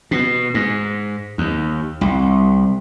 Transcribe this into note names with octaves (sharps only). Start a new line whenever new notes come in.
B2
G#2
D#2
C2